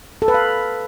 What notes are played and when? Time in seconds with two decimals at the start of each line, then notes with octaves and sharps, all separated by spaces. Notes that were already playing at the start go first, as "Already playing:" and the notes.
0.22 A4
0.28 B4
0.34 F5